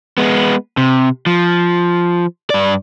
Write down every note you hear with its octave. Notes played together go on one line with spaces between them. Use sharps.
G#3 B3
C3
F3
G2 D5